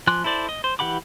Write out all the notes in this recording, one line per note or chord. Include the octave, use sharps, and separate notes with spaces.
F3 G#5 C6 D6 F#6
E4 A4 C5 D5
D#5
C5
E3 G4 F#5 B5 D6